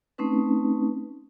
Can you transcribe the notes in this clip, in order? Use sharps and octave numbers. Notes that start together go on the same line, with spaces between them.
A3 C4 C#4 D#4 B4